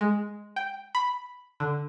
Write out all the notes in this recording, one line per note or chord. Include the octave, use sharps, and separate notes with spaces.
G#3
G5
B5
D3